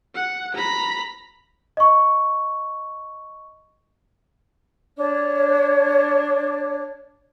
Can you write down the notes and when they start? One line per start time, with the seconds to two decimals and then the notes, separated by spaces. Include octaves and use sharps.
0.15 F#5
0.55 A#5 B5
1.77 D#5 C#6
4.97 D4 C#5